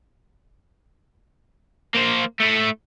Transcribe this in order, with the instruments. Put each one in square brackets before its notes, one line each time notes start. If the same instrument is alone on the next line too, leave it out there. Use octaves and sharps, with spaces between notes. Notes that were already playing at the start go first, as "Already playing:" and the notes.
[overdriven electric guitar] A#3 C5
A3 E4